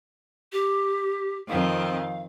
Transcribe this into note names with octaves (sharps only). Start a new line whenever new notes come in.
G4
F2 D#3 C4 F5